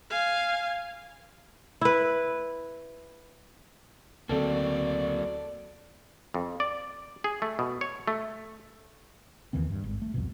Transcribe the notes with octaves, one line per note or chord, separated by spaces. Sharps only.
F5 G#5
E4 B4
D2 D3 F#3 A#3 C4 A4 D5
F2
D5
G#4
A3
B2
C#5
A3
D#2 D#3 E3 C4
G2
G#1
A3
C2 F2 B2